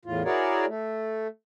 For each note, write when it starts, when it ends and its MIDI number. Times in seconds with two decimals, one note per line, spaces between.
0.05 0.22 40
0.05 0.22 45
0.05 0.22 65
0.25 0.65 64
0.25 0.65 66
0.25 0.65 68
0.25 0.65 70
0.25 0.65 73
0.25 0.65 74
0.67 1.27 57